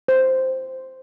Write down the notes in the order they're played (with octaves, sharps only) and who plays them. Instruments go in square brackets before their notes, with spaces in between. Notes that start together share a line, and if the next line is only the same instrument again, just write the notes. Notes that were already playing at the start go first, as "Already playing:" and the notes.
[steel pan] C5